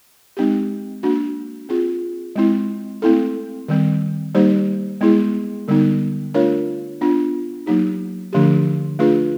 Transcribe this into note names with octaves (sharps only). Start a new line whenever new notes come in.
G#3 C4 D#4 G4
A#3 D4 F#4
C4 F4 G#4
G#3 C4 E4
A3 C4 E4 A4
D#3 G3 C4
G3 A#3 D#4 G4 C5
G#3 B3 E4 G#4
D3 G3 B3 D#4
A3 D4 F4 A#4 C#5
B3 D4 F4
F#3 A#3 D#4 G4
D3 F3 A3 D4 G4
A3 D4 F4 G#4 B4